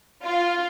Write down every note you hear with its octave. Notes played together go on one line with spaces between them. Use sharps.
F4